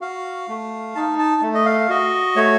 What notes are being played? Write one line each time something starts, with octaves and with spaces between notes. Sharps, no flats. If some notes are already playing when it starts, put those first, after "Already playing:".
F#4 F5
A3
D#4 A5
A5
A3
D#5
F5
F#4 D#5
A3 C#5